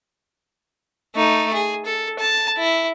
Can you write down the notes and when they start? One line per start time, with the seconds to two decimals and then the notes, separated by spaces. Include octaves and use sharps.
1.15 A3 D#4
1.53 G#4
1.86 A4
2.19 A5
2.57 E4